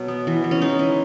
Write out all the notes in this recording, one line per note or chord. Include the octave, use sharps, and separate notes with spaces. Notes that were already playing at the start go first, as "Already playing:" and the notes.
Already playing: B2 F#3 F#4
B3
E3
E3
C#4
G#3 D#4
E3